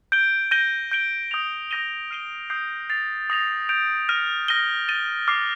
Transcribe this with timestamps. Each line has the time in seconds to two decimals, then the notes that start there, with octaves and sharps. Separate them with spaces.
0.12 G6 D7 G7
0.51 G6 A#6 D#7 G7
0.91 G6 D7 G7
1.31 D#6 G6 A#6 F7
1.71 D#6 G6 A#6 D#7 G7
2.11 F6 C7 D#7 G7
2.50 D#6 G6 C7
2.89 A6 C7 F7
3.30 D#6 A#6 F7
3.69 G6 D7 F7
4.09 F6 A#6 D#7
4.48 F6 A#6 D#7 G7
4.88 A6 D#7 G7
5.28 D6 F6 C7